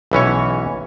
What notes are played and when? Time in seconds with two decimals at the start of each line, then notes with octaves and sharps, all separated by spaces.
0.12 B1 E3 C#4 C#5